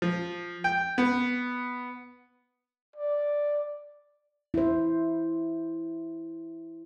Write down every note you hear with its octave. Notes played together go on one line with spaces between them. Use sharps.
F3
G5
B3
D5
E4 C5